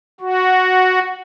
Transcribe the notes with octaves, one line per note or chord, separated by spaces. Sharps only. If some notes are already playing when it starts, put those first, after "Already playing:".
F#4